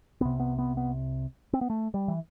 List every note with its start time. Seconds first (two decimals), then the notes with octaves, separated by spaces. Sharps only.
0.21 C2 C3 B3
0.40 B3
0.58 B3
0.77 B3
1.53 C4
1.61 B3
1.70 A3
1.94 G3
2.08 E3